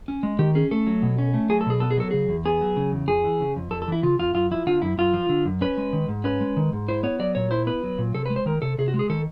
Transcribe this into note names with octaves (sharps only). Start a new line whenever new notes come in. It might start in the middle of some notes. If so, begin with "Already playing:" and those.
C#4
G#3
D#3 G4
C#4 G#4
A3 A4
F#3
B2
C#4
A3
F#3 G#4
A4
B2 G#4
B3 A4
G#4
F#3 A4
C#3 G#4
E2
B3 G#4
F#3
C#3
E2
F2 G#4
E3
C#3
F2
F2 A4
A4
E3 E4
C#3 F4
F2 F4
F#2 F4
F3 E4
D3 F4
F#2 E4
F#2 F4
F3
D3
F#2
C#4 B4
G#3
D#3
G#2
C#4 B4
G#3
D#3
G#2
E4 C5
B3 C#5
F#3 D5
A#2 C#5
E4 C5
B3 B4
F#3
A#2
C3 A4
B4
G#3
C5
D#3 A#4
C3 A4
C3 G#4
F#4
G#3
G#4
D#3 A4